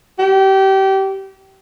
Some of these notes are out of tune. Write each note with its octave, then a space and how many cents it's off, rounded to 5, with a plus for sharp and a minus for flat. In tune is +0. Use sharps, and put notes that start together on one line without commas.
G4 -25